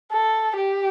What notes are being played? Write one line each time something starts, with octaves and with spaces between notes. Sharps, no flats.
A4
G4